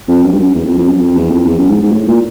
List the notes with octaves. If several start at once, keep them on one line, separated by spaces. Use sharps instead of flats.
F2
F#2
G2
F#2
E2
F2
F2
F#2
F2
E2
F2
E2
F#2
G#2
G#2
A2
A#2